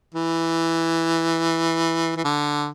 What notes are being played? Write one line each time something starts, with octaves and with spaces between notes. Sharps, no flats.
E3
E3
D3